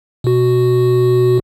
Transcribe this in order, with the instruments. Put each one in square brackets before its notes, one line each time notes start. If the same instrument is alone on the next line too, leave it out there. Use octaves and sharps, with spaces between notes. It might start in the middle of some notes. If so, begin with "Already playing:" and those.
[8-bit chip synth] B2 F#4